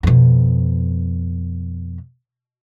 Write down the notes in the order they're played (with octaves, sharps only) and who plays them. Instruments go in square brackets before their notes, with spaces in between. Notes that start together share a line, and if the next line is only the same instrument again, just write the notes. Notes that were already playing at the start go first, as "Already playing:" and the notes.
[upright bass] F2 B2